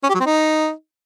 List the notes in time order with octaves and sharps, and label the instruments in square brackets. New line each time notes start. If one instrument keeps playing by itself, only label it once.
[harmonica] C#4
G4
F#3
C4
D#4